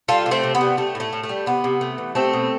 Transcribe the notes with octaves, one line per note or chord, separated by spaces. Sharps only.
G3 F4 A4
C3
A3 C4
C3
B3
G3
G3 A3
A2
A3
A2
A3
G3
C3 B3
C3
A3
E3
G3 A3 C4
B2